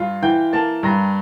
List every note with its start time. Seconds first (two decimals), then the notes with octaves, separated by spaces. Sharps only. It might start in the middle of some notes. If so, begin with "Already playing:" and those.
Already playing: G2 F4
0.23 E3 G5 G6
0.53 A#3 A5 A6
0.83 G2 A#5 A#6